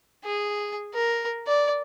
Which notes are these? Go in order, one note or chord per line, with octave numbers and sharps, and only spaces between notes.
G#4
A#4
D5